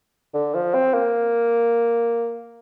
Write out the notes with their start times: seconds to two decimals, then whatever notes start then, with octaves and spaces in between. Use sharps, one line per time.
0.34 D3
0.54 F3
0.74 C4
0.94 A#3